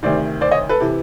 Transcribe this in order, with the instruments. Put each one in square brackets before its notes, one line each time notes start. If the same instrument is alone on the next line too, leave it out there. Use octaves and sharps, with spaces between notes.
[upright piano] D2 C3 D#3 C5 D5
C5 D5
C#5 D#5
A4 B4
C3 E3